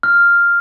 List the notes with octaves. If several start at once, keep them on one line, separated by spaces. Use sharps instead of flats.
F6